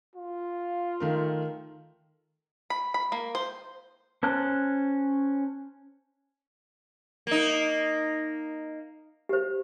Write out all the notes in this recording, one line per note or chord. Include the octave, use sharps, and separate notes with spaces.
F4
D#3 A3 A#4
B5
B5
A#3
C5
C#4 C5 A5 F#6
A#3 D#4
G4 C5